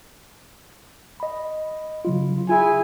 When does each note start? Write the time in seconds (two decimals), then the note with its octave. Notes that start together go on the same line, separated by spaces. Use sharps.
1.20 D#5 B5
2.05 C#3 F#3 F4
2.49 E4 F4 G#4 G#5